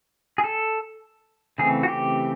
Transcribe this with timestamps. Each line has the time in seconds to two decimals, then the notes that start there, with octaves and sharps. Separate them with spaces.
0.38 G#4
0.44 A4
1.58 C#3 E3 A3 C4 G#4
1.83 F#4
1.88 G4